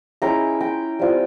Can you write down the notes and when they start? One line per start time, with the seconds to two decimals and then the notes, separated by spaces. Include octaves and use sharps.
0.22 G#3 C#4 E4 G5 A#5
0.61 G5 A#5
0.99 G3 C4 F4